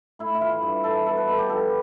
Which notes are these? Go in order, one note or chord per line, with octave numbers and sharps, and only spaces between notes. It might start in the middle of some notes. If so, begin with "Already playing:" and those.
A2 E4
E4
E3 F4
G2
E3 A4
B2 A4
B4
B2 A4
G4
F3 A4